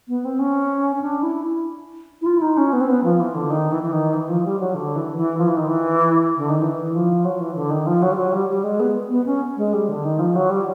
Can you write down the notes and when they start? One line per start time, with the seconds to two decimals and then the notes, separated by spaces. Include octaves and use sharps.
0.08 B3
0.25 C4
0.39 C#4
0.96 C#4
1.02 D4
1.23 E4
2.21 E4
2.26 F4
2.37 E4
2.42 D#4
2.57 C#4
2.73 B3
2.81 C4
2.89 B3
3.04 F3
3.20 E3
3.35 D3
3.50 D#3
3.72 E3
3.83 E3
3.93 D#3
4.14 E3
4.29 F3
4.45 G3
4.60 F#3
4.75 D3
4.96 E3
5.17 E3
5.38 F3
5.48 E3
5.57 D#3
5.68 E3
6.37 D3
6.50 D#3
6.61 E3
6.93 F3
7.25 F#3
7.40 E3
7.55 D3
7.70 D#3
7.87 F3
8.02 F#3
8.12 G3
8.18 F#3
8.32 G3
8.49 G3
8.64 G#3
8.80 B3
9.10 B3
9.26 C#4
9.57 G#3
9.73 G3
9.89 D3
10.05 D#3
10.19 F3
10.36 F#3
10.50 G3